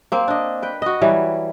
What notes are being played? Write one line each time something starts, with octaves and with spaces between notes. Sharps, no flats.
A#3 C4
D4 D#5
B4 G5
F#4 D#5
E3 F#3 G3